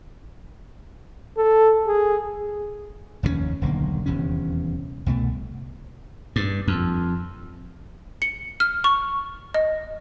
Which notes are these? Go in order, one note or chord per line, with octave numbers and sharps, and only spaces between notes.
A4
G#4
F1 D#2 A#2 C#4
D#1 B1 D3 A#3
D#1 E2 C3 C#4
C2 B2 A3
G2
F2
C#7
F6
C#6
D#5